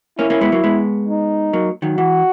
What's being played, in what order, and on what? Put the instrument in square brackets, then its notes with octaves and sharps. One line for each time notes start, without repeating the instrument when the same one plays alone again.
[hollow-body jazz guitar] A#3 C#4 [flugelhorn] E4
[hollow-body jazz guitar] A#3 C#4
G#3 B3
F#3 A#3
G#3 B3
[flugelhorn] D#4
[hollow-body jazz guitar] F#3 A#3
D#3 F#3
[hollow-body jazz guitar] E3 [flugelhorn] F#4